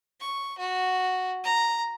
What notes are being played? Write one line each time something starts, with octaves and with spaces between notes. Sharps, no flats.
C#6
F#4
A#5